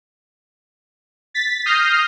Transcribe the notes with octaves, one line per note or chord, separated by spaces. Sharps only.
A6 B6
D#6 F6 G6 A#6 C7